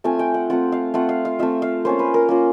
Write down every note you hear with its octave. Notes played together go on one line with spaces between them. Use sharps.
A3 C4 F4 G#5
G5
F#5
A3 C4 F4 F#5
F5
A3 C4 F4 F#5
F5
F5
A3 C4 F4 E5
F5
A#3 C#4 F4 C5
B4
A#4
A#3 C#4 F4